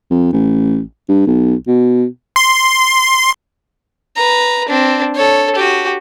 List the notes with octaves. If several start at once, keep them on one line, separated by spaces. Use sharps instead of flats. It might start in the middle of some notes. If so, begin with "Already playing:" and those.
F2
A1
G2
B1
B2
C6
B4 A#5
C4 D4
A4 C#5
F#4 G4